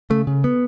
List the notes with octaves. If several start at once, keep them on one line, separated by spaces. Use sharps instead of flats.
C#3 A3
C#3
B3